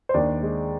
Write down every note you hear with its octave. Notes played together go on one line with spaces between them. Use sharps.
C5
D#2 D4 D5
G#3